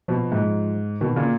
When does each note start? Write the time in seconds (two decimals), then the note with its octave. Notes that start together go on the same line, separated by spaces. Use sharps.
0.08 B2 F3
0.32 G#2
1.01 B2 D#3
1.16 A#2 C#3